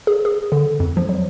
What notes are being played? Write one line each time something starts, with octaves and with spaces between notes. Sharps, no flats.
G#4
G#4
D3
F2
F3
F#3